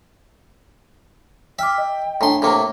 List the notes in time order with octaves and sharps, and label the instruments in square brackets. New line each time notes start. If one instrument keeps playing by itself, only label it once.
[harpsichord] E5 [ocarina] G5 [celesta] D6 F6 B6
[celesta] D#5
[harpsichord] A2 C6 [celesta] D4 G#5 A#5
[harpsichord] A2 C3 A#3